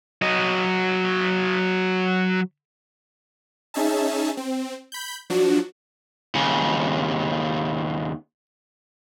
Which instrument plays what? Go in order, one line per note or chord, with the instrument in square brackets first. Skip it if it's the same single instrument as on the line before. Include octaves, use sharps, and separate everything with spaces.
[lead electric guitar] F#3 D#5
[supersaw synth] C#4 D#4 G#4 E5 A5
C4
B5 G6
F3 F#3 D4 F#4
[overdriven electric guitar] D#2 C#3